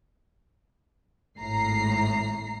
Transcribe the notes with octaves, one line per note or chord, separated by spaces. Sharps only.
G#1 A2 A#5 C7